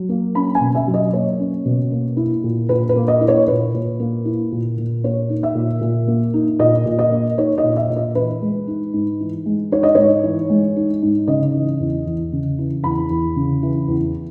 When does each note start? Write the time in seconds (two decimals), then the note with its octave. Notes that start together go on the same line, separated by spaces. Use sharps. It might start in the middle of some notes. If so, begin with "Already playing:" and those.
Already playing: F#3
0.09 A#3
0.35 C#4 B5
0.55 G#5
0.61 B2
0.75 E5
0.88 F#3
0.94 D#5
1.13 A#3 C#5
1.40 C#4
1.65 B2
1.91 A#3
2.17 E4
2.44 A#2
2.69 A#2 B4
2.89 B4
2.96 A#3
3.08 D#5
3.21 E4
3.28 C#5
3.48 A#2 B4
3.74 A#2
4.00 A#3
4.25 E4
4.52 A#2
4.78 A#2
5.04 A#3 C#5
5.29 D#4
5.43 E5
5.55 A#2
5.81 A#2
6.08 A#3
6.34 D#4
6.59 A#2 D#5
6.86 A#2
6.99 D#5
7.11 A#3
7.38 D#4 C#5
7.58 D#5
7.63 A#2
7.76 E5
7.90 A#2
7.96 D#5
8.15 E3 B4
8.42 G#3
8.67 D#4
8.93 G#2
9.20 E3
9.46 G#3
9.72 D#4 C#5
9.83 D#5
9.95 G#2 C#5
10.23 E3
10.50 G#3
10.76 D#4
11.02 G#2
11.27 C#3 D#5
11.54 E3
11.80 E2
12.06 E2
12.32 C#3
12.58 E3
12.84 E2 B5
13.10 E2
13.36 C#3
13.63 E3
13.88 E2